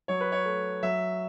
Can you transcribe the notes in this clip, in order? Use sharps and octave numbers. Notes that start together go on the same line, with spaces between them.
F#3 C#5
B4
C#5
A3
F#3 E5